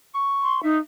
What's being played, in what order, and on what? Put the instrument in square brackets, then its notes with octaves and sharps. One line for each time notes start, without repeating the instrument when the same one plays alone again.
[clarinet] C#6
[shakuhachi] C6
[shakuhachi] D#4 [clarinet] E5